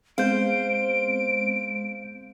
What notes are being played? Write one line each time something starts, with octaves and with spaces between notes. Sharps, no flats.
G#3 B3 C4 C5 F5 G6 D7